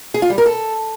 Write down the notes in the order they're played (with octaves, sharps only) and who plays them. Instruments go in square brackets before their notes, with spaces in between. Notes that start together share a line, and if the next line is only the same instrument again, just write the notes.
[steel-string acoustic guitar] G#4
F4
G3
A#4
A4